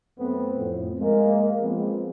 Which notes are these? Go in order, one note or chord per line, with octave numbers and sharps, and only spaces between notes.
F#2 A3 B3 C4
F2 A2
G#3 A#3
F3 G#3 B3 C4